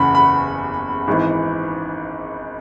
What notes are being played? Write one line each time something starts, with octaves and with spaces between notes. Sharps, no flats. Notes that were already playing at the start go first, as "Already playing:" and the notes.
Already playing: F#1 E2 C#3 E3 F#5 B5
B5
G#1 G#2 E3